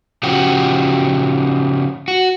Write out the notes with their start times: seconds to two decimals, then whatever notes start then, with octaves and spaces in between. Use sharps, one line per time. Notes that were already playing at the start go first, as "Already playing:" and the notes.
0.23 C#3 F3 F#4 G4
2.08 F#4